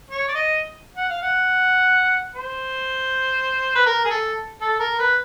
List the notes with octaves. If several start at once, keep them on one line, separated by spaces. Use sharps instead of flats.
C#5
D5
D#5
F#5
F5
F#5
C5
B4
A#4
G#4
A4
A4
A#4
B4